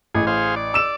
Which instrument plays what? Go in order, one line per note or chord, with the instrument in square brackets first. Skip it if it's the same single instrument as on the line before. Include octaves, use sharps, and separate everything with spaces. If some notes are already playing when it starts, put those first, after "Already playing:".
[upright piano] A1 [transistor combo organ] G#4
[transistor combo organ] G#4 C5 F5
D5
[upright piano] E6 E7